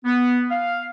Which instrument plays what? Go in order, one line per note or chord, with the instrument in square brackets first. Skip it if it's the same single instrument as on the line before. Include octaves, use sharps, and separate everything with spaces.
[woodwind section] B3
F5